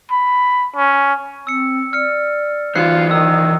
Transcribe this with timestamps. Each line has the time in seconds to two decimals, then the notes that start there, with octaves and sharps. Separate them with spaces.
0.11 B5
0.76 C#4
1.47 C4 E6 C#7
1.93 D5 F6 C#7
2.75 E3 D#4 F4 C5 F#6 C7 C#7
3.11 D#3 E6